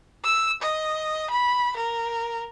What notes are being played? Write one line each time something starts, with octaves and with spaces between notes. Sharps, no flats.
E6
D#5
B5
A#4